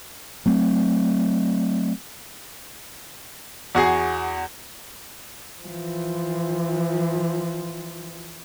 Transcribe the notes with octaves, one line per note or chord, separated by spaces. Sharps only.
F#3 A3 C4
E2 F#4 G#4 C7
E3 F3